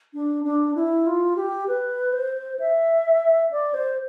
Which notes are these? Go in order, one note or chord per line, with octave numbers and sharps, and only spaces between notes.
D4
D4
E4
F4
G4
B4
C5
E5
D5
C5